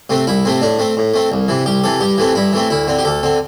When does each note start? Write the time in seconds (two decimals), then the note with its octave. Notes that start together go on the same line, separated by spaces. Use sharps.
0.10 C3 A3 C4
0.27 C2 E4
0.45 C3 A3 C4
0.62 A2 D4
0.79 A3 C4
0.97 A2
1.14 A3 C4
1.32 C2
1.48 C3 E3
1.66 C2 G4
1.84 C3 E3 A4
2.01 G2 G4
2.18 E3 A3 C4
2.35 G2 E4
2.53 E3 A3 C4
2.70 D2 E4
2.87 D3 C4
2.99 G4
3.05 D2 A4
3.23 D3 C4